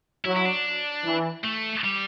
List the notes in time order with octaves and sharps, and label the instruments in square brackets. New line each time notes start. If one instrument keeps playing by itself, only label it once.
[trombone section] F#3 [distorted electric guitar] E4
[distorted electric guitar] E4
D4
[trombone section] E3
[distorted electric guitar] A3
G3